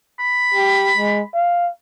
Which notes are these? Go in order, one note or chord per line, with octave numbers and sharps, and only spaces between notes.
B5
G4
G#3
F5